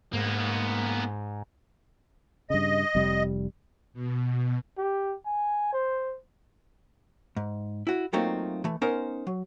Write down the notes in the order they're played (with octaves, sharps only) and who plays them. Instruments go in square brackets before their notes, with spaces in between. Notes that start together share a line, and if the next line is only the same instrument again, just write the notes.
[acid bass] G#2 [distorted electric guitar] A#3 B3
[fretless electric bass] G2 C#3 [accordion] D#5
[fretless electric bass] F1 C3 G3
[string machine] B2
[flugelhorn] G4
G#5
C5
[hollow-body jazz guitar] G#2
E4 F#4
F#3 A3 A#3 C4 D#4 F4
E3 A3
B3 C#4 D#4 A#4 C5
F#3